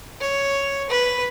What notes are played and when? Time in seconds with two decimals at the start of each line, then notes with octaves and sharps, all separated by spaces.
0.21 C#5
0.89 B4